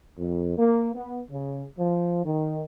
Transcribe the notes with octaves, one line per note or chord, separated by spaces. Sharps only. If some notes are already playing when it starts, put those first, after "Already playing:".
F2
A#3
B3
C#3
F3
D#3